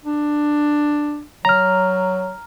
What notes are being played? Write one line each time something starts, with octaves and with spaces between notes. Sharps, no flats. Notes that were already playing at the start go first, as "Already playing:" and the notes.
D4
F#3 A#5 F6